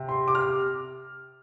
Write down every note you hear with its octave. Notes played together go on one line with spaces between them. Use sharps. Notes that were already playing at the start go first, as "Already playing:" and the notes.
Already playing: C3
C6
D6
F6